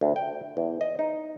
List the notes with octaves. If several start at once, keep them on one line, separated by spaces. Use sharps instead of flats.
D2
G5
E2
D#5
D#4